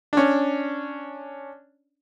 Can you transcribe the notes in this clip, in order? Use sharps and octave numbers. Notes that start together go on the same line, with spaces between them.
C#4 D4